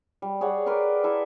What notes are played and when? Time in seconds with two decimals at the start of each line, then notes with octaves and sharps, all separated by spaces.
0.22 G3
0.41 G#4 C#5 D5 F#5
0.66 A#4 B4 D5 C6
1.04 E4 A4 E5